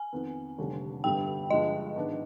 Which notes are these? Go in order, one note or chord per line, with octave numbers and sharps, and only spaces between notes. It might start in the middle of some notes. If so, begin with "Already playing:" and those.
Already playing: G#5
F2 D#3 B3
F1 D#2 D3 G3
G1 G2 D3 G3 G5
G1 G2 F3 G#3 D#5
G#2 D#3 B3 D4